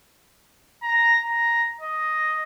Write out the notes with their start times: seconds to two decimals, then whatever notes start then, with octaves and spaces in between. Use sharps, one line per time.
0.82 A#5
1.20 A#5
1.81 D#5